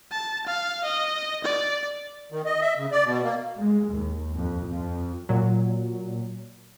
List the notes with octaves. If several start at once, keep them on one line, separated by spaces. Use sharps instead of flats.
A5
F5
D#5
D5
D#3
D#5
E5
C#3
D5
B2
A#3
G#3
D#2
F2
F2
A#2 F#3